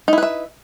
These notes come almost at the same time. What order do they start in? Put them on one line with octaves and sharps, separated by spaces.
D#4 E4 B4 E5